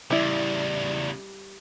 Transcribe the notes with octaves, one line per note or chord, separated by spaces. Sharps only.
E2 C#3 G3 E4 D5